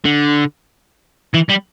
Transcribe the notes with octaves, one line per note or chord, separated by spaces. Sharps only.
D3
E3
G3